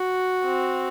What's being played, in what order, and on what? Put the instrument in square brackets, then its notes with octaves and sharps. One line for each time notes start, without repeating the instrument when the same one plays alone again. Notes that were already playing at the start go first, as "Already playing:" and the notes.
Already playing: [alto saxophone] F#4
[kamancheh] C4